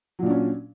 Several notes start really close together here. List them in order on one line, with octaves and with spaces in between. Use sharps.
F#3 A#2 D4 C#4